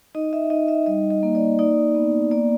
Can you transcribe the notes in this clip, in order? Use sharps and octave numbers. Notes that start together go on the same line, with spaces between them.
D#4 D#5
E5
D#4 D#5
E5
G3 D#5
D#5
A#3
D5
D#4 D5
B3
A#3 D5